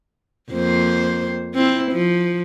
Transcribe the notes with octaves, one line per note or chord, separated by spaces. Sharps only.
F2 A#3 C5
C4 E4
F3